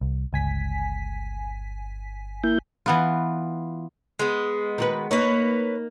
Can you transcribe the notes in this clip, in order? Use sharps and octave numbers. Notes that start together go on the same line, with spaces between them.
C2
G1 C#2 G#5 B6
A#3 E4 G6
E3 B3 F4
G#3 B3
D#3 F#4 B4
A#3 D#4 B4 C#5